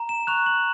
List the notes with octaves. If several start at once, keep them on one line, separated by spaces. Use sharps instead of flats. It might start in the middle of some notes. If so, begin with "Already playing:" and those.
Already playing: A#5
E7
C#6 F#6 F7
F#7